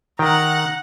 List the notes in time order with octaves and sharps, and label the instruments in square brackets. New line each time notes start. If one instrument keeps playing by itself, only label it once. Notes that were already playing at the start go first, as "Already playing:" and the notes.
[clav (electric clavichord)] D#3 G5 [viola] F#5 A#5